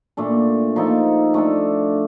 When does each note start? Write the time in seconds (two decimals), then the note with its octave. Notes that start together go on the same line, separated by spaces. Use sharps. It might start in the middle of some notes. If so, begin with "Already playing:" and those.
0.17 A#2 A3 D4
0.76 F3 A#3 D#4 A4
1.34 A3 D4 A4